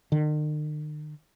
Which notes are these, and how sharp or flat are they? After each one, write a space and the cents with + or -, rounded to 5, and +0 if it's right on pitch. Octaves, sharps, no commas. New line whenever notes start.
D#3 -45